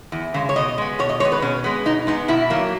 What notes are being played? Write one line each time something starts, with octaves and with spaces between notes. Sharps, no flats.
E2
C#3 G#3
C#5
B2 D#5
G#3 B3
B2 C#5
D#5
G#3 B3 C#5
B4
B2 C#4
G#3 B3
B2 D#4
G#3 B3 D#4
B2 E4
F#3 A#3